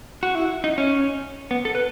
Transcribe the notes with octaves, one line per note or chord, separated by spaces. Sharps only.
F#4
E4
D#4
C#4
B3
A4
B4